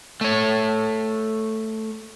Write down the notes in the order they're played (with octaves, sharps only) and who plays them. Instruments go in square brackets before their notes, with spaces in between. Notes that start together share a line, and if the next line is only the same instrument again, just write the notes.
[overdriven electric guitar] A3 C#5